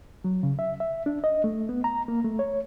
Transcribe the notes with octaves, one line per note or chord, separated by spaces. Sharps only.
F#3
C#3
E5
E5
D4
D#5
A3
B3
A#5
A#3
A3
C#5